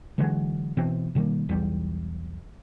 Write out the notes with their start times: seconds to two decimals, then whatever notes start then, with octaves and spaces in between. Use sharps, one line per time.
0.18 D3 E3 F#3 G#3
0.77 B2 E3 C4
1.15 B2 D#3 G3 A#3
1.49 B1 E2 G3